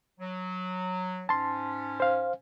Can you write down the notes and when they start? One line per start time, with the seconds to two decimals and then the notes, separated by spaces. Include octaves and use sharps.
0.20 F#3
1.29 G#2 C#4 A5 C6
2.00 C5 F5